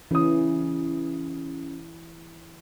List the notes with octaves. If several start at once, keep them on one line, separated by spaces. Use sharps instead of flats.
C#3 E3 D#6